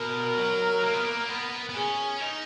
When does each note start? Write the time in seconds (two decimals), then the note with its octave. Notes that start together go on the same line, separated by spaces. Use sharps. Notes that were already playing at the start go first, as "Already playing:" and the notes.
Already playing: B2 A#4
0.37 F#3
0.83 A#3
0.94 B3
1.05 A#3
1.29 B3
1.69 B3
1.75 C#4 G#4
2.20 D#4